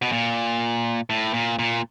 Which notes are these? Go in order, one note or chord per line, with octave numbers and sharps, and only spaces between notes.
B2
A#2
A2
A#2
A#2